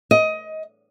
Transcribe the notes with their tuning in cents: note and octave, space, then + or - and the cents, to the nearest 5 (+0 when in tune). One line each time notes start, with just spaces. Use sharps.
D#5 +20